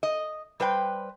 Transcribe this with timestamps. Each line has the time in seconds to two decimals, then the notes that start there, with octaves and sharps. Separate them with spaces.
0.03 D#5
0.60 G3 B4 C5 G5